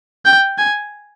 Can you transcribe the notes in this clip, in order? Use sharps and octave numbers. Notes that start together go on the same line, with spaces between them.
G5
G#5